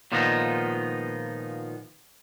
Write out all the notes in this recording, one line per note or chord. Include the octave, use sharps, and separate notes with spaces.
A#2 D#3 F3 G#3 B3 D#4